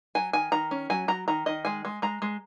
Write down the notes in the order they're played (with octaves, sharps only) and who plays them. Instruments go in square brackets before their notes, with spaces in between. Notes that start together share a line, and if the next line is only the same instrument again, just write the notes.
[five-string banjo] F#3 G#5
D#3 G#5
D#3 A#5
C#4
F#3 G#5
F#3 A#5
D#3 A#5
D#3 D#5
G#3 G#5
G#3
G#3 A#5
G#3